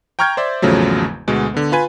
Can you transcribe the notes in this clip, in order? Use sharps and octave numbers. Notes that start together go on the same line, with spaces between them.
G5 A#5 C#6 F6 G6 G#6
C5 D5 E5
G#1 E2 C#3 F3 F#3 A3
D2 B2 G#3
D3 B3
F4 B4 G#5